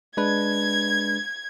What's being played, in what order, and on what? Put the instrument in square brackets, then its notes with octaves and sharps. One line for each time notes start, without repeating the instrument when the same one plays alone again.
[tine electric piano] G#3 D4 B4 [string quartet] G#6